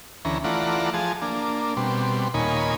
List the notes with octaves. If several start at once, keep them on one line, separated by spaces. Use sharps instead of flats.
D2 E3 C#4 A#5
E3 A3 F4 D5 F#5 A#5
F3 G#4 A5
A#3 D4
B2 G3 C4
D#2 A#2 D#4 C#5 G#5 B5